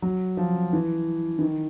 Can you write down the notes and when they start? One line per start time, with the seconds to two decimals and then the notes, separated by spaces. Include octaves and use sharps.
0.02 F#3
0.37 F3
0.73 E3
1.39 E3
1.42 D#3